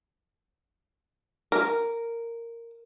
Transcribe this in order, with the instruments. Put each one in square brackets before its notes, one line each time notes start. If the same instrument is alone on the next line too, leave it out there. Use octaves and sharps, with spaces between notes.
[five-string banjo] A#4